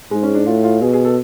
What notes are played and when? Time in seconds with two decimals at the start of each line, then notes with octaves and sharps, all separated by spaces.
0.11 G#2 G#3
0.23 C#4
0.35 D4
0.46 A2 F4
0.64 F4
0.81 B2 G#4
0.93 G#4
1.05 A4